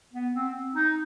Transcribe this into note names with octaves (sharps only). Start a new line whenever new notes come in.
B3
C4
D#4